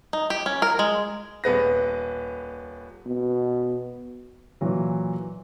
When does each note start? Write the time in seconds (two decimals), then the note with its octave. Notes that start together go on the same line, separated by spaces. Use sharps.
0.13 D#4
0.30 G4
0.46 C#4
0.62 A#4
0.79 G#3
1.44 D#1 B3 B4 A#6
3.06 B2
4.61 A#2 E3 F#3